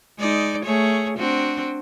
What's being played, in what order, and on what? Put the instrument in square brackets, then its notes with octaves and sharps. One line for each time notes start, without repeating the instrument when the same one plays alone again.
[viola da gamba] G#3 D#4 D5
A3 G#4 C#5
C4 D4 F#4